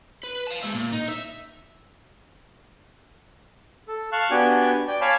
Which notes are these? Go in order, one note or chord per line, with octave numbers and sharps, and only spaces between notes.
B4
F5 A5
G#3 E5
A#2
D#4
E5
A4
F5 A5 C#6 F#6
B3 D4 F#4 G4 D5 G#5
D5 G5
C#5 F5 G#5 A5 B5 D6